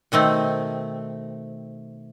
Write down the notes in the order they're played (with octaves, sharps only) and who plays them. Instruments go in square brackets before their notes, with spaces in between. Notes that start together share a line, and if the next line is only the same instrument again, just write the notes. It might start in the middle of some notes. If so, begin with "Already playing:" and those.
[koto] B2 D#3 A3 C4